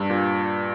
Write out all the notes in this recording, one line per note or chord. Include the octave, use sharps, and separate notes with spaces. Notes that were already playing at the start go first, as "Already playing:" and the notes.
Already playing: G2
A#2